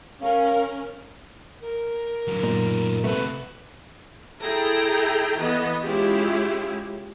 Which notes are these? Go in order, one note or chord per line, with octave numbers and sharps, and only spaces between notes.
C#4 A#4 F5
A#4
D3 F#3
F#2 A#2 D#4
C3 A3 F#4 B4
E4 G#4 A4 G5 A#5
E3 B3 D#5
G#3 C#4 E4 F4 G4 G#4